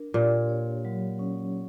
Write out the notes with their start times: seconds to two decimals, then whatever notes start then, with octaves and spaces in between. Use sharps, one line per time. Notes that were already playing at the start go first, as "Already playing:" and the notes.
Already playing: D4 A#4
0.14 A#2 G4
0.49 C#5
0.85 F#3
1.19 C#4